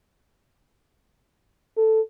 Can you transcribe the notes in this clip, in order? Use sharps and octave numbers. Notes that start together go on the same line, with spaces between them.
A4